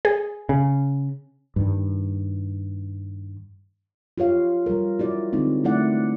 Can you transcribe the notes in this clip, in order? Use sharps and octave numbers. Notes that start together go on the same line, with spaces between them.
G#4
C#3
G2 D#3
F4 G4 C#5 F5
G3 A#4
E4 F#4 D5
D3 G#3 C4 D#4
A3 E4 D5 F#5